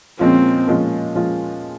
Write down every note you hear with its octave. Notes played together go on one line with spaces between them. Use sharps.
A#2 F3 G#3 C4 C#4 F4
A#2 F3 G#3 C#4 F4
A#2 F3 G#3 C#4 F4